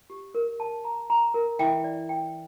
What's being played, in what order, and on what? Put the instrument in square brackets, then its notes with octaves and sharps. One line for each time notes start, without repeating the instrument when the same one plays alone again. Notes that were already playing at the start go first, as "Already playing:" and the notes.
[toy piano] G4
A#4
A5
A#5
A#5
A#4
[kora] E3 [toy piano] G5
[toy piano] D5
G5